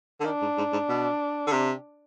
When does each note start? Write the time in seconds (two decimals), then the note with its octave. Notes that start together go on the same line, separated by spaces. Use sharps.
0.20 D3
0.25 D#3 D4
0.42 G#2
0.58 G#2
0.72 G#2
0.89 B2
1.47 D3
1.52 C3